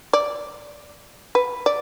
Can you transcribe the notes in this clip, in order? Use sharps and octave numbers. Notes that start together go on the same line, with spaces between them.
D5
B4
D5